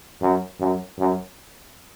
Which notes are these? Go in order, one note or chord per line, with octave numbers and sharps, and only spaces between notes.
F#2
F#2
F#2